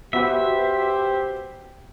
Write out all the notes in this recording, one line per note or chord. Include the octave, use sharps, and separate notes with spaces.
B3 F#4 G4 B4 C5 E5